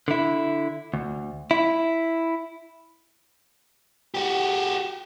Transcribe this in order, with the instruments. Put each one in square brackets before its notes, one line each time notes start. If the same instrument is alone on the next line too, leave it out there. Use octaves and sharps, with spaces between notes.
[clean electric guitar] D3 E4
D2
E4
[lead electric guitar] F#4 G4